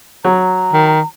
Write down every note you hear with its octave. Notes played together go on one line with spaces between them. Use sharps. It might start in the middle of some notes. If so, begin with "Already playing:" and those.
F#3 A#5
D#3